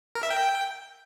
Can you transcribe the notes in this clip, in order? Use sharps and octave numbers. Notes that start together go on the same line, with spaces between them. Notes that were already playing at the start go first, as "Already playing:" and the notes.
A#4
E5
G5